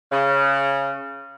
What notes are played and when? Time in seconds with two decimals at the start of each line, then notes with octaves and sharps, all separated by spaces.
0.12 C#3